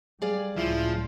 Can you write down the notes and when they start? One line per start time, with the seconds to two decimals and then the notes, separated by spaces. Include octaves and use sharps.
0.22 G3 G#4 D5 F5
0.56 C#2 A2 F3 E4